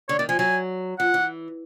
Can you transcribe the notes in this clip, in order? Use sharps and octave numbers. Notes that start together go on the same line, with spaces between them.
D3 C#5
D#3 D5
F3 G#5
F#3 G#5
F3 F#5
E3